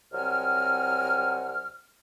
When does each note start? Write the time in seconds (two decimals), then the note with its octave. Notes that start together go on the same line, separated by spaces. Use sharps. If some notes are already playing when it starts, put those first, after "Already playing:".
0.13 C2 F#3 C4 F#5 G#5 F6